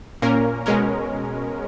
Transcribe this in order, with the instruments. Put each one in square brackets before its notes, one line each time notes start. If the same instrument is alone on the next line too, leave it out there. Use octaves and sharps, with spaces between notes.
[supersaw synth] A#2 A#3 C#4 A#4
B2 G#3 C#4 A#4